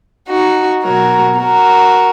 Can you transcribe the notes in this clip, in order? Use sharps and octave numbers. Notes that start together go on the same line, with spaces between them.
D#4 F#4
B2 F#3 F#4 A#4
F#4 A#4